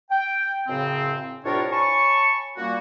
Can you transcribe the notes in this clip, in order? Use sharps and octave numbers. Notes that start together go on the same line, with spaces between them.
G5
F#2 A2 C#3 C4
C2 A2 D4 F4 A#4 C#5
C#5 G#5 A5 B5 C#6
A#2 G3 A#3 C#4 F#4